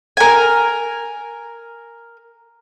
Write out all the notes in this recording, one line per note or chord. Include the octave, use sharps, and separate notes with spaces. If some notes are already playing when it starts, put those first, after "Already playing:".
A#4 G#5